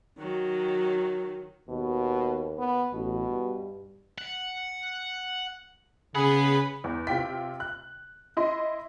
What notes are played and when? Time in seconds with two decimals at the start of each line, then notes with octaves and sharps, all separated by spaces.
0.18 D#3 F#3
1.69 D#2 B2
2.59 B3
2.93 A1 B2
3.29 G2
4.18 F#5
6.15 C#3 G#4 B4 F#5 B5
6.84 E2
7.07 C3 F4 G5 B6
7.60 F#6
8.37 E4 D#5 C6